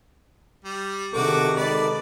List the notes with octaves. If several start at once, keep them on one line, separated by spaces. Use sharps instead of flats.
G3
C3 D#3 D4 F#4 G#4 A4 D6
G#3 D#4 A4 B4 D5